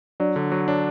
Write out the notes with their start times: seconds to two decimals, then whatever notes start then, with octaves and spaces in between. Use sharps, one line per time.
0.20 F#3 D4 D5
0.36 D3
0.52 F#3 C#5
0.68 D4 C#5